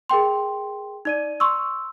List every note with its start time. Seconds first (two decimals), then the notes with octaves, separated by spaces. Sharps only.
0.09 G#4 A#4 G5 C6
1.05 D#4 D5 D#7
1.40 C6 C#6 E6